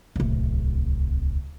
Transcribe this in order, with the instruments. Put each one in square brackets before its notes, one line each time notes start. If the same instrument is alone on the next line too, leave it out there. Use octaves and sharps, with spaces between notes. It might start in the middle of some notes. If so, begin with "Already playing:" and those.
[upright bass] D1 C2